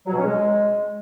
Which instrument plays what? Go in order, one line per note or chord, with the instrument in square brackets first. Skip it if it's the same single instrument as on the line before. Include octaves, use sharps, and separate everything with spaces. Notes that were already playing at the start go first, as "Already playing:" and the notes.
[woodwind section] F#3
B2
C#4
G#3